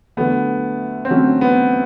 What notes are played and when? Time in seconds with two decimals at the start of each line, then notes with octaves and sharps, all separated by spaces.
0.17 D3 F#3 A3 B3
1.05 C4
1.10 D3 F#3 A3 C#4
1.41 B3